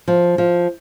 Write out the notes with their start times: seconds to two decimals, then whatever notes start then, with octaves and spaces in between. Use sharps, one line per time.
0.08 F3
0.38 F3